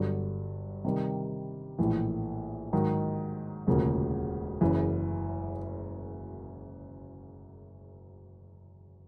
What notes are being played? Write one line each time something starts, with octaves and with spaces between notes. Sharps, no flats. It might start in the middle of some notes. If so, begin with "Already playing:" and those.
Already playing: G1 G2 D3 F#3
C3 D#3 G3
A#1 A2 E3
G#2 D#3 F#3
E1 D2 C#3 F3 A#3
F#1 F#2 C#3 E3